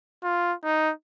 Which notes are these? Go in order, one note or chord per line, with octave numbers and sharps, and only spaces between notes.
F4
D#4